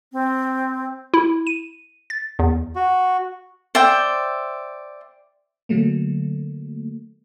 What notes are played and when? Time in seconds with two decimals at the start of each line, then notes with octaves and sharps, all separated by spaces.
0.13 C4
1.14 E4
1.47 D#7
2.10 A6
2.39 E2
2.76 F#4
3.75 C5 D5 E5 G5
5.69 D3 F#3 A3 A#3